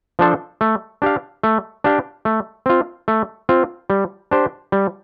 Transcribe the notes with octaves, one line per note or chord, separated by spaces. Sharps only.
F3 D4 A4 C5
A3
D4 G4 F5
A3
D4 G4 F5
A3
C4 F4
A3
C4 F4
G3
D4 G4 C5
G3